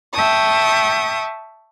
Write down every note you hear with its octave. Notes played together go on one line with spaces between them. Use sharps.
E5 G5 A5 C#6 D#6